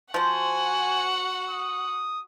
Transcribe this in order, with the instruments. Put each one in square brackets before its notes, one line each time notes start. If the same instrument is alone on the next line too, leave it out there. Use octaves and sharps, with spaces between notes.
[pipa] F3 C5 [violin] F#4 F#5 [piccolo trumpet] G#5
[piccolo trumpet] D#6